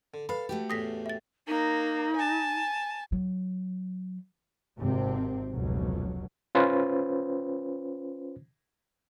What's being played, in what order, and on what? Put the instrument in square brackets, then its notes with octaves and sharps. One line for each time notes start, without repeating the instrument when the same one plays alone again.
[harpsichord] D3
[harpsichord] A4 [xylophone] B4 B5 [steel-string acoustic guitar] F5
[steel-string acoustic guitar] A3 F#4 G4
[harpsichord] E2 A2 C6 [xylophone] D#6 A#6 B6
[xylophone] E5 A6
[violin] A#3 [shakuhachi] D#4
[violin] G#5 A5
[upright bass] F#3
[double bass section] G#1 C3 C4
F1 C#2 B2 F#3
[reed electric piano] C#4 F4 B4 C5